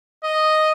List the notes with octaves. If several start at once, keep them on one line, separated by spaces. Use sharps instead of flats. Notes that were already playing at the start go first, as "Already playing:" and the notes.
D#5